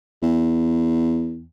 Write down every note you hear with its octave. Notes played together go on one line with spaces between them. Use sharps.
E2